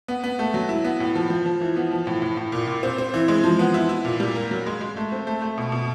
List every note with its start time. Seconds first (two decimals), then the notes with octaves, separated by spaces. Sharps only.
0.08 B3
0.24 B3
0.39 A3
0.54 F#3
0.69 E4
0.84 B3
1.00 A2
1.16 F3
1.30 F3
1.46 F3
1.61 E3
1.76 B3
1.91 F3
2.07 A2
2.22 A2
2.37 A2
2.52 A#2
2.67 A#2
2.83 C4
2.98 C4
3.14 E3
3.28 G#3
3.44 F3
3.59 B3
3.74 E4
3.89 E4
4.05 A#2
4.20 G3
4.35 A#3
4.51 F#3
4.66 G#3
4.81 G#3
4.96 A3
5.12 C4
5.27 A3
5.42 A3
5.58 B2
5.72 B2